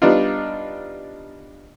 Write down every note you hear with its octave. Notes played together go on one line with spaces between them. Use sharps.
G3 B3 D4 D#4 F4